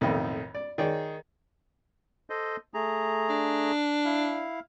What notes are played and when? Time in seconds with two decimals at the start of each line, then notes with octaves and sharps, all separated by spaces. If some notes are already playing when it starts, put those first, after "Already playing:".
0.01 B1 F2 A2 C3 D#3
0.55 D5
0.78 D#3 G#4 C#5 D5
2.30 A4 C5 D#5
2.74 A3 G#4 A#5
3.29 D4
4.05 E4 F5